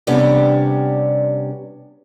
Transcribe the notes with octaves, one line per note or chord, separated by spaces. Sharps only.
C3 G3 B3 C#4 D4 G4